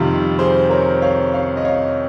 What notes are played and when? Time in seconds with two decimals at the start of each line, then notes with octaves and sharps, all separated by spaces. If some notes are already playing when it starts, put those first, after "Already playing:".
Already playing: F2 C3 D#3 G3 F4
0.39 G#4 C5
0.70 A#4 C#5
1.02 C#5 F5
1.34 C#5 F5
1.57 D#5
1.65 C#5 F5